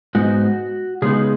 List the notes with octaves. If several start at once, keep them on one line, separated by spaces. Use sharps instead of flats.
G#2 G#3 B3 D#4 F#4
C#3 G#3 B3 D#4 G#4